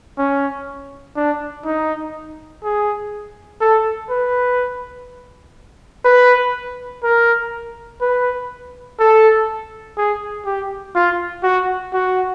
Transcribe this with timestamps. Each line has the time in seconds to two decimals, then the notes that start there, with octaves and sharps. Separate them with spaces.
0.18 C#4
1.16 D4
1.65 D#4
2.64 G#4
3.61 A4
4.10 B4
6.05 B4
7.03 A#4
8.01 B4
9.00 A4
9.97 G#4
10.46 G4
10.95 F4
11.43 F#4
11.93 F#4